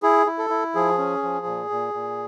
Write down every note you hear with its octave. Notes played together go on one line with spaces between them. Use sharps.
E4 G#4
E4
A4
E4
F3 G#4
C#4
F3
A#2
A#2
A#2